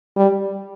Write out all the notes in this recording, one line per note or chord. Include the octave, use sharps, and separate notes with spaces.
G3